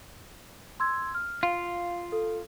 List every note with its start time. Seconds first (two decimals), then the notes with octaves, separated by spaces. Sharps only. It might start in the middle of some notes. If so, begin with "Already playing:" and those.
0.80 C6 E6 G#6
1.15 F6
1.43 F4 F5
2.12 A4